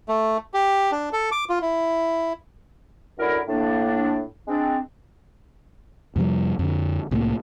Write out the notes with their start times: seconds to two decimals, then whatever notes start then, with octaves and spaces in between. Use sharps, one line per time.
0.09 A3
0.54 G4
0.92 D4
1.13 A4
1.32 D6
1.49 F4
1.62 E4
3.18 F#2 D3 E4 A#4
3.48 A2 A#3 D4
4.48 G#3 C4 D4
6.16 F2 C3 F3 G3
6.59 F2 D3
7.11 C2 A2 F#3 A#3